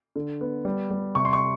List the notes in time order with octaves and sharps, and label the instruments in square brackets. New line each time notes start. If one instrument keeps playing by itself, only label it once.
[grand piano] D3
B3
G3
G3
C3 C#6
C6
C#6